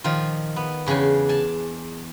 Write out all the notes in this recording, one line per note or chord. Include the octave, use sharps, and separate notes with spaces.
A#2 D#3 F3 F4
B3
E2 C#3 D4 G5 G#5
D5 G#5 A5